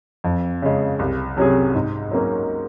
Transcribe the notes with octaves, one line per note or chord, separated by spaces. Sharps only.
F2
C#3 G#3
C2
C3 F#3 C#4 G#4
G#2
F#3 A#3 C#4